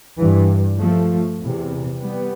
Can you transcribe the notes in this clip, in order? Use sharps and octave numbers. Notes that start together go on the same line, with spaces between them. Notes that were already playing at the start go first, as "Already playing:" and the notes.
G2 E3
F3 A3
E2 C3
G3 B3